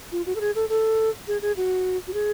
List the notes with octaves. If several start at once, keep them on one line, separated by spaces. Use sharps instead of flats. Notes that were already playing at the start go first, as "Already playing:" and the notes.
F4
F#4
A4
G#4
A4
A4
G#4
G#4
F#4
F#4
G#4